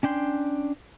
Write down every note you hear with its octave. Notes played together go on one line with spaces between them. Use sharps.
C#4 D4 G5 C6